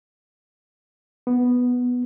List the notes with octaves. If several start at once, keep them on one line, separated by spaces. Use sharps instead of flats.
B3